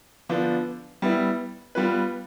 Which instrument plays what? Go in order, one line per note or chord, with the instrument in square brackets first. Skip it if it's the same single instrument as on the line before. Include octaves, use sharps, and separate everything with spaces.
[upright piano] D3 F3 B3 D4
G3 B3 E4
G3 B3 F4 B4